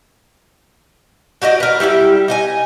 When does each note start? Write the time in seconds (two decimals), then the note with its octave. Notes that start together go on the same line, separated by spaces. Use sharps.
1.42 F#4 G4 D5 D#5
1.60 A#4 B4
1.80 G3 E4 F#4 G4
2.28 D#4 D#5 G#5